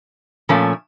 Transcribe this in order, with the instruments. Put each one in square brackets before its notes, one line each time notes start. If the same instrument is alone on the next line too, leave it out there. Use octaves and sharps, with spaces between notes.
[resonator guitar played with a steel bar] A#2 F3 A3 C#4